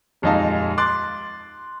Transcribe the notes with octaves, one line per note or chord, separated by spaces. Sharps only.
D#1 F2 G#3 D#4 F5 A5
C6 D6 F#6 A6